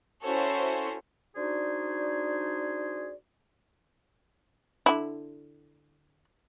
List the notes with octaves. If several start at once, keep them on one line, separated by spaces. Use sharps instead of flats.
C#4 E4 F#4 A4 C5 C#5
D4 D#4 F#4 G#4 C5 D5
D3 E4